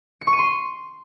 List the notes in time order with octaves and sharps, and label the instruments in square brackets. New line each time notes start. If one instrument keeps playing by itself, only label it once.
[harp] C#7
C#6
D#7
C6